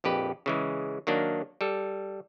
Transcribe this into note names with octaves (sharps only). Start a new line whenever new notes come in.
A#1 F2 G4 B4
C#3 E3 G#3
D#3 F#3 A#3 D4
G3 A4